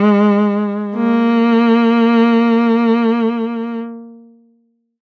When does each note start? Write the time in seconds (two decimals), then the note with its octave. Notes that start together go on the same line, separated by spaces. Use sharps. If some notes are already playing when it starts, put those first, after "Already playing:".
Already playing: G#3
0.96 A#3